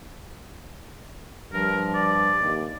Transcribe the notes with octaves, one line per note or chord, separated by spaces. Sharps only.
G2 F3 A#4
D5
D#2